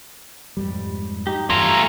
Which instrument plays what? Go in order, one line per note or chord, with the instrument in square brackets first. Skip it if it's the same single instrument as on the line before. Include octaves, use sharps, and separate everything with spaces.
[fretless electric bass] F2 G#2 G3
[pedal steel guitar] D#4 G4
[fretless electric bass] E2 G2 [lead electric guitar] A3 F4 [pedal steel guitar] G#5 A#5